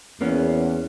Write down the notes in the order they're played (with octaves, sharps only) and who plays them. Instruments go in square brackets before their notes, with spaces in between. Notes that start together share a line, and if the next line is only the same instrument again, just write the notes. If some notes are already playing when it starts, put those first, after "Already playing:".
[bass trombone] E2 [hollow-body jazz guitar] A#3 B3 C#4